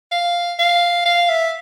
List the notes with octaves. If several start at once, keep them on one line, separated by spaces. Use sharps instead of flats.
F5
F5
F5
E5